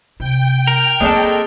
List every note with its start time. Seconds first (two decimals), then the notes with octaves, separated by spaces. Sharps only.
0.20 C3 G5
0.67 A#4
1.00 G#3 A#3 C4 D4 A4